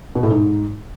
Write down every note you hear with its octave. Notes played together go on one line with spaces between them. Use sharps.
B2
A2
G#2